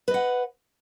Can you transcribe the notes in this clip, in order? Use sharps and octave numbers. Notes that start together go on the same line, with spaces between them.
B4 D#5 F#5